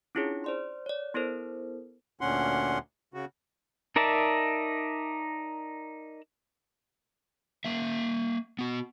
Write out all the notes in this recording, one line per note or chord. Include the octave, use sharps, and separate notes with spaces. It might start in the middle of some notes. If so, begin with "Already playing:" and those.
C#4 D4 E4 F4 G#4 C#5
C5 D5 C6
C#5 D5
B3 E4 A4 A#4 C5
D2 A#2 D3 C#4 F#5 C6
C#3 F#4
D#4 A#4 D5 E5 A5
A#3 E5
B3 F#4